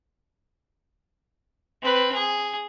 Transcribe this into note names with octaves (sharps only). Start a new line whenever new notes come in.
C4 B4
G#4